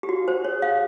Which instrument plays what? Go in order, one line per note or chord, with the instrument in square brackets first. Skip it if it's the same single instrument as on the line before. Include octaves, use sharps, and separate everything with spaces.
[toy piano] G4
[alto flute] F4 [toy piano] F#4
[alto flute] F#4 [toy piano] C5
[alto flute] G#4 [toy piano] C#5
[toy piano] F5